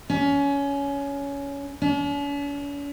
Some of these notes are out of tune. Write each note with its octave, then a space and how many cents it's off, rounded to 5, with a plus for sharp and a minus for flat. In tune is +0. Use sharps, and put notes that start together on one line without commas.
C#4 +20
C#4 +45